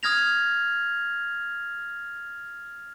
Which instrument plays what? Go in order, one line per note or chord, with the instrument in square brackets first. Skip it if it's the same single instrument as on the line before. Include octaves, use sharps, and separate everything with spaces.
[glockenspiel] D#6 F6 G#6 A#6 F7